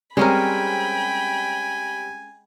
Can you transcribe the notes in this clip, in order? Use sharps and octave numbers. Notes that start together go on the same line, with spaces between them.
G3 G#3 C4 C#4 A#4 G5 G#5 B5